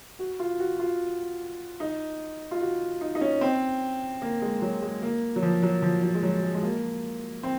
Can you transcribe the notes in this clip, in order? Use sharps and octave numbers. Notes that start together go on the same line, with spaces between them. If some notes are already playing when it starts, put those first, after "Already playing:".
F#4
F4
F#4
F4
D#4
F4
F#4
D#4
D#4
C#4
C4
A#3
G#3
F#3
G#3
A#3
F#3
F3
F#3
F3
F#3
G#3
F#3
G#3
G#3
A#3
C4